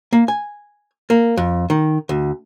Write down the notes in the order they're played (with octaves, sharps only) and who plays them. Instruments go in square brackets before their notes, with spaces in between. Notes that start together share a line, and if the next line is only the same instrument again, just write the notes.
[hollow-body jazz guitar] A#3
G#5
A#3
F2
D#3
D2